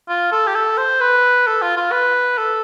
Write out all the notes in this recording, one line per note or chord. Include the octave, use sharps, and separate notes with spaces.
F4
A4
G4
A4
C5
B4
A4
F4
F4
B4
A4